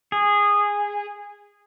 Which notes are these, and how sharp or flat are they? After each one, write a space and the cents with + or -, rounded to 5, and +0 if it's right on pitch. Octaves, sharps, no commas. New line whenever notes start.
G#4 -15